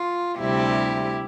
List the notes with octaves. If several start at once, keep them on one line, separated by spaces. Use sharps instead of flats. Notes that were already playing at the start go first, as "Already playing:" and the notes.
Already playing: F4
D2 C3 G3 E4 G4